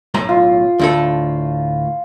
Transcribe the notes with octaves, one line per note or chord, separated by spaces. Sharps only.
B1 A2 A#5
F4
D2 A2 A4